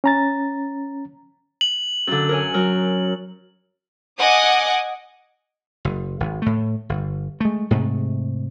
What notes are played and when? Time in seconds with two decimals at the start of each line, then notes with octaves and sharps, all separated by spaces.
0.04 C#4 A#5 A6
1.61 F#7
2.07 F#2 D3
2.29 A#4 C#5 G#5
2.54 F#3 A#4
4.18 D#5 F#5 G#5 D6 D#6
5.85 F#1
6.20 G#1
6.42 A2 A3
6.89 G1
7.40 G#3 A3
7.71 G#2 C3 G#3 A3